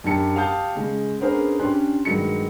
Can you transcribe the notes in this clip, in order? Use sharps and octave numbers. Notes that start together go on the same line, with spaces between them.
F#2 D4 G4 A5 C#7
G4 F5 A5 D#6 G6
C#3 G#3
B3 C#4 D4 G#4 A#4 C5
C#4 D4 G4 C6 F#6
G2 D#3 F#3 G#3 C#7